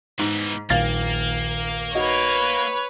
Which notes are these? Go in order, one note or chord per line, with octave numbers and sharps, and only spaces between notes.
G#2 B2 E3
D#1 A#1 D#3 A#3 F5 A6
D#4 F#4 B4 C#5